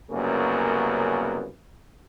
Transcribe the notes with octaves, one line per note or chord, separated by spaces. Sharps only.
C2 F#2 C#3 A#3 B3